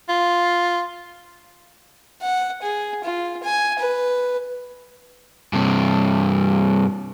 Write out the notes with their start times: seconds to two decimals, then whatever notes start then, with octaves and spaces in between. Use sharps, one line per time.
0.09 F4
2.22 F#5
2.62 G#4
3.04 F4
3.44 G#5
3.79 B4
5.53 G2 C3